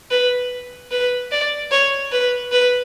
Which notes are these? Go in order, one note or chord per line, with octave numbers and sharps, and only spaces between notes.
B4
B4
D5
C#5
B4
B4